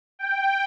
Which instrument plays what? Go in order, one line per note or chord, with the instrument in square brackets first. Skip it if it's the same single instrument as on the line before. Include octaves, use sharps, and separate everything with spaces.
[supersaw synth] G5